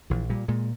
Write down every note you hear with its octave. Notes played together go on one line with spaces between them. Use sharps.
A#1 E3
A#2 G3
A#2 G#3